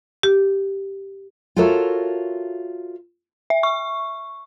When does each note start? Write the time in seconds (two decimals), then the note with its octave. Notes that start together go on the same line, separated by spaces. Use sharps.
0.23 G4
1.56 F4 F#4 A4 A#4 C#5 E5
3.50 E5
3.63 C#6